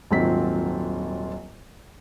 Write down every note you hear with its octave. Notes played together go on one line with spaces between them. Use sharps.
D#1 G#1 F#3 C4 F4 B6